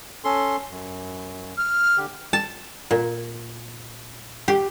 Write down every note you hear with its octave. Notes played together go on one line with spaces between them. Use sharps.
C#4 A4 C6
F#2
F6
D3 G4
A5
A#2
G4